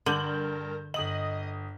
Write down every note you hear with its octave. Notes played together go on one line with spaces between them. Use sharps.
G2 D3 A#4 G6 F#7
G1 D#5 D#6 F#7